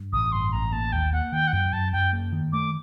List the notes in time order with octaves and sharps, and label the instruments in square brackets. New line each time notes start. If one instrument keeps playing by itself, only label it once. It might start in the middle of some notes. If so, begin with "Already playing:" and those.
Already playing: [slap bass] G2
[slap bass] A1 [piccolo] D#6
[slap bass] G2 [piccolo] C6
[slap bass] A1 [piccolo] A#5
[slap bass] A#3 [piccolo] A5
[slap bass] D#2 [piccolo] G5
[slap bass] A#3 [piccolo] F#5
[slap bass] D#3 [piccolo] G5
[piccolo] F#5
[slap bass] F#2 [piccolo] G5
[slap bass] F#2 [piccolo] A5
[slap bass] F#2 [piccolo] G5
[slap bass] A#3
D#3
[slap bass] A3 [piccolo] D6